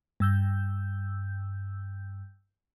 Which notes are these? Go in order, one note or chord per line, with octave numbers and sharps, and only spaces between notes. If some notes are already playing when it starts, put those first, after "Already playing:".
G2 E6 G6